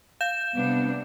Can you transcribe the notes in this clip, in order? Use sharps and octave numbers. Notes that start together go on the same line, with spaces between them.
F5 G6 E7
C3 G3 B3 D4